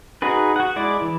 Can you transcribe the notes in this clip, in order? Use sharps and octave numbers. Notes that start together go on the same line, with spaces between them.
D#4 F#4 G#4 B4
F#4 F#5
G#3 E4 D5
E3